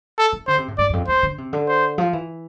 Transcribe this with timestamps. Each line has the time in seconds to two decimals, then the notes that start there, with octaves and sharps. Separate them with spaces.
0.18 A4
0.32 E3
0.47 D3 C5
0.58 C3
0.68 A2
0.78 G2 D5
0.89 E2
0.93 F2
1.08 E2 C5
1.23 D3
1.38 C3
1.53 D3
1.68 C5
1.98 F3
2.13 E3